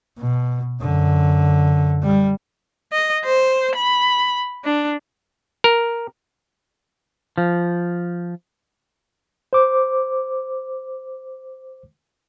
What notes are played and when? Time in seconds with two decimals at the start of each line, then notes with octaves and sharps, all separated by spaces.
0.19 B2
0.81 F#2 D3
2.03 G3
2.93 D#5
3.25 C5
3.76 B5
4.65 D4
5.64 A#4
7.38 F3
9.53 C5 D6